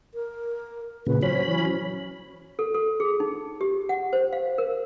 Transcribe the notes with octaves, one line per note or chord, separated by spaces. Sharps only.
A#4
A#2 C#3 B4
F#3 C#4 C5 B5
E3
A4
A4
G#4
D#4
G4
F#5
C5
F5
A#4